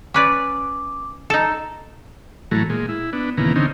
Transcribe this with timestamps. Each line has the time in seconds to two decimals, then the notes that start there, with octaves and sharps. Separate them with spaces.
0.14 C#4 B4 D5 D6
1.30 D#4 A4
2.51 A2 E3 F#3 A3 A#5
2.70 A#2 G#3
2.89 E4
3.13 B3 D4
3.37 D#2 A#2 C#3 E3 B3 A#5
3.56 D3 C4 C#4 D#4